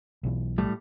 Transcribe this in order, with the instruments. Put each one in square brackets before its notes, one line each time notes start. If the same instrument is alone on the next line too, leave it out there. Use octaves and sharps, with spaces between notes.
[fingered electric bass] B1 B2 E3
[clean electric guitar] A2 G3 A3